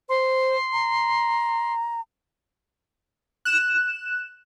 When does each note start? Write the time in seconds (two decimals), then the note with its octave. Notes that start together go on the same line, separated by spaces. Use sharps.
0.09 C5 C6
0.73 A#5
3.45 F#6 E7